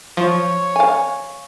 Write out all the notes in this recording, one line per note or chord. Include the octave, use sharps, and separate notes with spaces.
F3 C#5
F5 G#5